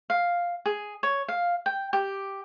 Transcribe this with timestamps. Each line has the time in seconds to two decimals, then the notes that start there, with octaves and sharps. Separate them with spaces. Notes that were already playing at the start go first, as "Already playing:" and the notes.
0.10 F5
0.66 G#4
1.03 C#5
1.28 F5
1.66 G5
1.93 G4